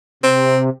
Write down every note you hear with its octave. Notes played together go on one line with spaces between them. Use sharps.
C3 C4